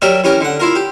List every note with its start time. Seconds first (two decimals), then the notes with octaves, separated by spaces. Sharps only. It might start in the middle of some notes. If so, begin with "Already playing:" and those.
0.02 F#3 G3 A#4 D5 E5
0.24 E3 C#4 G4 A#4
0.41 D3 F#5
0.60 E4 F4 A#4
0.75 G4